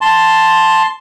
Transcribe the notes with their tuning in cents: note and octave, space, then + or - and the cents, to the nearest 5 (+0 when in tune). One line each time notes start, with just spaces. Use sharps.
A5 +0 C6 +0